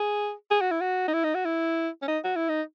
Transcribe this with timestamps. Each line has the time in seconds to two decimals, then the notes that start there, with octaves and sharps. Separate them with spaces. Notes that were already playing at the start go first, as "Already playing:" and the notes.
Already playing: G#4
0.51 G#4
0.61 F#4
0.71 E4
0.81 F#4
1.08 D#4
1.13 E4
1.24 D#4
1.35 F#4
1.45 E4
2.02 C#4
2.08 D#4
2.24 F#4
2.36 E4
2.49 D#4